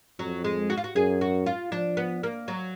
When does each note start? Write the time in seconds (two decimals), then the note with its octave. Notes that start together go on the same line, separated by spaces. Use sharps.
0.19 F2 F#3
0.44 G#3
0.70 F#4
0.77 F4
0.84 F#4
0.95 F#2 G#4
1.21 F#4
1.46 F4
1.72 F3 D4
1.97 B3
2.23 A#3
2.48 F#3